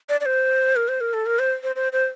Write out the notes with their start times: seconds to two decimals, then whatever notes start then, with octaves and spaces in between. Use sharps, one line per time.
0.09 D5
0.21 D5
0.26 C5
0.76 A#4
0.88 C5
1.01 A#4
1.14 A4
1.26 A#4
1.39 C5
1.63 C5
1.76 C5
1.93 C5